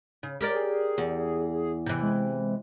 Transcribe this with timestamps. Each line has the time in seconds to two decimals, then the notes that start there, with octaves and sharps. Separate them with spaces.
0.23 C#3
0.41 G4 A#4 D5
0.55 G#4
0.98 E2
1.86 C3 E3
2.02 G#3